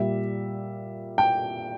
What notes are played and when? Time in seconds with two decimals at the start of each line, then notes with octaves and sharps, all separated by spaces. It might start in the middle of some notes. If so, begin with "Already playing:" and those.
Already playing: A#2 G3 E5
1.18 G5